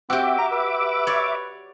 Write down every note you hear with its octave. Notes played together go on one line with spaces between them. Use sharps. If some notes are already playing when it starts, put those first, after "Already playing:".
C4 F#4 G4 E5 D6
A#5
B4
C#5 D5